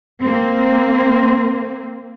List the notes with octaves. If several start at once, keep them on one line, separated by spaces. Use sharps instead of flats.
A#3 C4